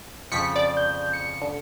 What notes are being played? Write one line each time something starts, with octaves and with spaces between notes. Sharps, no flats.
F2 C#3 F3 B6 C#7
D5
G6
C#7
D3